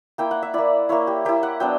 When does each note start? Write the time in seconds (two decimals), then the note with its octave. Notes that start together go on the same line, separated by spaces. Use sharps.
0.18 A#3 E4 G5
0.31 F#5
0.43 E5
0.54 A#3 E4 D5
0.89 A#3 E4 C#5
1.07 G4
1.25 A#3 E4 G4
1.43 F#5
1.60 F#3 B3 D4 G5